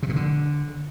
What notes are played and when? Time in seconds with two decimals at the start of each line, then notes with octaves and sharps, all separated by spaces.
0.03 C3
0.09 A#2
0.16 D3